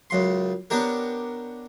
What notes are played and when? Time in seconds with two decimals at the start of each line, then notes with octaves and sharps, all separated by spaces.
0.10 C#2 F#2 C6
0.70 B3 C#4 D4 G4 A#4